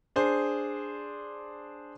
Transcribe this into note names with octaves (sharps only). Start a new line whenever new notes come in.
D4 G#4 C5